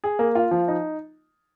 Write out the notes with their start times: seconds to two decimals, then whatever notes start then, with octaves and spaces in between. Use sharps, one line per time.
0.04 G#4
0.19 A#3
0.35 F4
0.51 F3
0.68 D#4